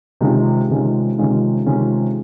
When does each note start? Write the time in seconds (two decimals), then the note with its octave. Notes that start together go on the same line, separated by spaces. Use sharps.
0.21 C3 D#3 G#3 C#4 F4
0.70 C3 D#3 G#3 C#4 F4
1.18 C3 D#3 G#3 C#4 F4
1.66 C3 D#3 G#3 C#4 F4